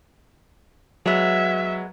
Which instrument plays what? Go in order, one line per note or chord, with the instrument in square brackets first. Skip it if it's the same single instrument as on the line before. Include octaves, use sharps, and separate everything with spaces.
[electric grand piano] F#3 [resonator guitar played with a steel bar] G#3 B3 [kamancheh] E5